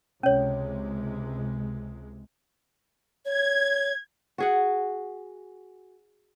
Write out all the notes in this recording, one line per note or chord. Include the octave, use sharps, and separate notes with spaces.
C#2 C3 G#3 C#4 C#5
C#5 G#6
F#4 G#4 F#5